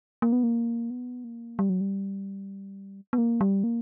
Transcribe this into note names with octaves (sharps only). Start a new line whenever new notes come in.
A#3
B3
A#3
B3
A#3
G3
F#3
G3
B3
A#3
G3
A#3